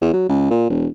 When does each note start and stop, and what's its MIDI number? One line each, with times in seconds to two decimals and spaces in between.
0.02 0.10 40
0.13 0.29 54
0.29 0.51 37
0.51 0.69 46
0.70 0.87 28